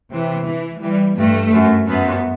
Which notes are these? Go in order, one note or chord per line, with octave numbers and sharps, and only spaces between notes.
C3 E3
E3
E3 G3
G2 A3
F#2
F#2 B3